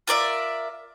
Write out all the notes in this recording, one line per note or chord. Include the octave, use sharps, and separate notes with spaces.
F4 A#4 D5 E5